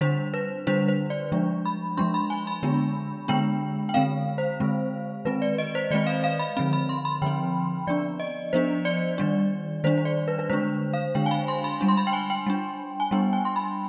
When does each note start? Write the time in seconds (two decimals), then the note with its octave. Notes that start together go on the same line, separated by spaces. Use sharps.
0.01 D3 G3 D4 C5
0.34 B4
0.67 D3 G3 D4 C5
0.88 C5
1.10 D5
1.32 F3 G#3 D4
1.65 B5
1.97 F3 G#3 D4 C6
2.14 B5
2.30 G#5
2.47 B5
2.63 D3 G#3 B3 D4
3.28 D3 G#3 B3 D4 G5
3.89 G5
3.94 D3 G#3 C4 F5
4.38 C5
4.60 D3 G#3 C4
5.25 D#3 G#3 C4 B4
5.42 D5
5.58 D#5
5.75 C5
5.91 D#3 G#3 C4 D5
6.07 F5
6.24 F5
6.39 B5
6.57 D3 F3 C4 B5
6.73 B5
6.89 C6
7.05 B5
7.22 D3 F3 C4 G5
7.87 F3 B3 D4 D5
8.20 D#5
8.53 F3 B3 D4 C5
8.85 D5
9.18 D#3 G3 D4
9.84 D#3 G3 D4 C5
9.98 C5
10.05 D5
10.28 B4
10.39 B4
10.50 D3 G#3 D4 C5
10.93 F5
11.15 D3 G#3 D4 G5
11.26 G#5
11.31 B5
11.48 C6
11.64 B5
11.81 G3 D4
11.88 C6
11.97 B5
12.07 G5
12.13 G#5
12.30 G5
12.47 G3 D4
13.00 G#5
13.11 G3 B3 D4 G5
13.33 G#5
13.45 C6
13.56 B5